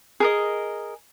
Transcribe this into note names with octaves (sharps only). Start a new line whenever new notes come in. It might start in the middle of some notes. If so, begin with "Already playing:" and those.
G#4 A#4 D#5